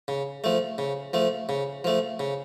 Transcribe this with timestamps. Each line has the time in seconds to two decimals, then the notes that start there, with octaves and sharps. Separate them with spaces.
0.08 C#3
0.44 F3 A3
0.78 C#3
1.13 F3 A3
1.49 C#3
1.84 F3 A3
2.20 C#3